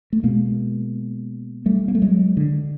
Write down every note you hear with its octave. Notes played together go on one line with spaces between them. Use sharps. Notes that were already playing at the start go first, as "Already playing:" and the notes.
A3
B2 G#3 A#3
G3 A3
A#3
A3
F#3 G#3
D3